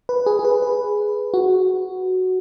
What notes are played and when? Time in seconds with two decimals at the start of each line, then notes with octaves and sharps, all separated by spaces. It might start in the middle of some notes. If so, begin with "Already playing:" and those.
0.09 B4
0.26 G#4
0.39 G#4
0.45 B4
0.62 B4
1.34 F#4